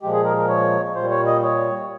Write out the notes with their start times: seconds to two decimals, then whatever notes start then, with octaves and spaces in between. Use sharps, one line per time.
0.02 A#2 F3 G#3 G4
0.13 G#4
0.25 A#4
0.38 A#4
0.49 C#5
0.95 A#2 G3 C5
1.10 C#5
1.27 D#5
1.42 C#5